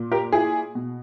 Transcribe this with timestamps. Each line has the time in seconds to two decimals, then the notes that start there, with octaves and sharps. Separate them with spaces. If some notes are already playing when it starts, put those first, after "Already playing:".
Already playing: A#2
0.12 G4 A#4
0.32 E4 G#4
0.75 B2